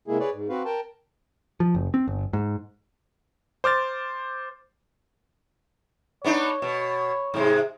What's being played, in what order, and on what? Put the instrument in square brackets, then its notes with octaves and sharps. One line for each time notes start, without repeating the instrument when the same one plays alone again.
[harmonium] C3 G#3 A#3 E4 G#4
G#4 B4 C#5 D5
G#2
C4 F#4 B4 F5
A#4 G5 A5
[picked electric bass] F3
F#1
C4
G1
G#2
[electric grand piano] C5 D6 F6 A6
[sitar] B3 D4 D#4 [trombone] C#5
[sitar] B2
G#2 C3 G#3